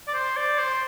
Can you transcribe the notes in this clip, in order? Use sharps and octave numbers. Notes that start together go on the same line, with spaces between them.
D5
C5
D5
C5